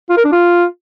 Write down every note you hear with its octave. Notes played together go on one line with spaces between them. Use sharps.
F4
A#4
D4
F4